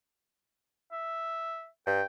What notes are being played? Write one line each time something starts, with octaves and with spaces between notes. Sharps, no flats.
E5
G2 G5